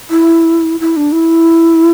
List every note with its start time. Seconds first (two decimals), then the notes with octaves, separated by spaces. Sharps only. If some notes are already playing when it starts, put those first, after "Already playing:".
0.10 E4
0.80 E4
0.97 D4
1.12 E4